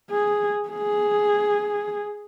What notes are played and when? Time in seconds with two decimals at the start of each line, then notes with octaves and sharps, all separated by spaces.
0.10 G#4
0.69 G#4